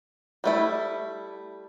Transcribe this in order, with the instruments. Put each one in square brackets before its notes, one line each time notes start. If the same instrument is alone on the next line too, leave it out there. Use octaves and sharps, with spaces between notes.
[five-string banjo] G3 A3 E4